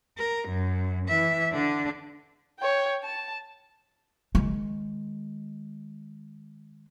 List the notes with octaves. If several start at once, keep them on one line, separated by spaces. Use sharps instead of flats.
A#4
F#2
E3 E5
D3 D4
C#5 G5
A5
D#3 G#3